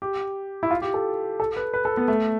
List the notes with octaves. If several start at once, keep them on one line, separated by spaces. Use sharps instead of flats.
G4
E4
F4
G4
A4
A4
B4
B4
A4
B3
A3